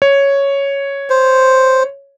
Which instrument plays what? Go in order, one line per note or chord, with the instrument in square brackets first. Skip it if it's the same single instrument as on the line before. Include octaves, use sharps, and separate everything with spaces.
[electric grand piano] C#5
[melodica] C5